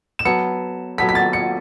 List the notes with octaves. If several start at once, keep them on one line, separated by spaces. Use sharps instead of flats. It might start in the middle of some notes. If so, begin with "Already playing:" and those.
E7
F#3 B3 A4 C#7
F#3 B3 A4 B6
B6
A6
C#7